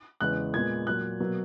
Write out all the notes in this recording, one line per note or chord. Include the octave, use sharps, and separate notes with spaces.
E2 C#3 E3 G#3 B3 F#6
A#2 G#3 B3 G#6
A#2 F#3 A#3 F#6
B2 F#3 A#3